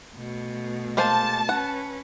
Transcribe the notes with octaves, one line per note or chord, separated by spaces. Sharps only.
B2 A3
G#3 A#3 C5 A5
C#4 B4 F#5